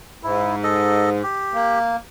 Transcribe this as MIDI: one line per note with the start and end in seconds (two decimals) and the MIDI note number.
0.23 1.22 44
0.23 0.55 64
0.64 1.10 69
0.64 1.10 75
1.23 1.79 67
1.54 1.96 58